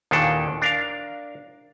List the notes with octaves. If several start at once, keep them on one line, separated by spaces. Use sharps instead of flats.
D#2 A#2 D#3 E3 D4 A4
D4 A#4 F5